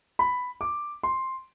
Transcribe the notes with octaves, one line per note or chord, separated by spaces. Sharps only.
B5
D6
C6